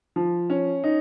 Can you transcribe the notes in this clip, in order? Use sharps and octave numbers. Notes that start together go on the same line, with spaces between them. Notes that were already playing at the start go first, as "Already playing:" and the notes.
F3
C#4
D#4